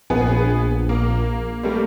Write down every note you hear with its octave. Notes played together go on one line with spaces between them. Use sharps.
A#1 B3 G#4
A#3
G3 A3 A#3